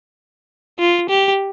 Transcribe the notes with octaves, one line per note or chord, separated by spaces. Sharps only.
F4
G4